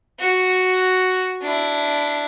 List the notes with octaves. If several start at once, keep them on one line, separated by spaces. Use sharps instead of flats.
F#4
D4 E4